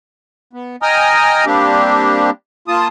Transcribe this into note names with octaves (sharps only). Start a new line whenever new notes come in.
B3
D#5 G5 G#5 A#5 D#6 F6
G3 A#3 C4 D4 G4
A#3 F4 A5 D#6